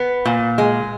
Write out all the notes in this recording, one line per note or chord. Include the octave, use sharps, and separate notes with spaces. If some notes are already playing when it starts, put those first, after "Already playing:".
Already playing: B3
A#2
G#3